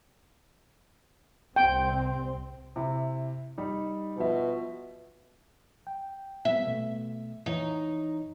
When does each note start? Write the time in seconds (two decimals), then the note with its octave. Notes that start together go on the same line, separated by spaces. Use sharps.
1.56 C2 C4 G5
2.76 C3 E4
3.58 G3 D#4
4.18 B2 F3 E5
5.87 G5
6.45 G3 B3 C4 E5
6.67 B2 A3
7.46 F2 E3 D#4 C#5